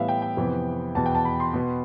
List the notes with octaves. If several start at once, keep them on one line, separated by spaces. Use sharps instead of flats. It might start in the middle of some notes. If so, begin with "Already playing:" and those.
Already playing: A2 E3 G3 B3 E5 F5
G5
G5
F2 C3 E3 B3
E2 B2 B3 A5
G5
A5
B5
C6
B2 B3